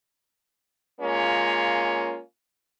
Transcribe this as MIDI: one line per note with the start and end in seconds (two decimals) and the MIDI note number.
1.00 2.18 56
1.00 2.18 58
1.00 2.18 61
1.00 2.18 65